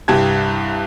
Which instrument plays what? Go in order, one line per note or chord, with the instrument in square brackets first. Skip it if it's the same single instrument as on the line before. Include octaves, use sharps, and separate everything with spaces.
[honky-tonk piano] C2 G2 G4 A5 G#6